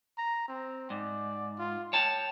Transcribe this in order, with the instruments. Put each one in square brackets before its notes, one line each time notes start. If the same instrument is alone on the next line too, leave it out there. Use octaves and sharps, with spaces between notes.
[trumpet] A#5
C4
[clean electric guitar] G#2 [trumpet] D5
[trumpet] F4
[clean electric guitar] C#5 A5 [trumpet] G5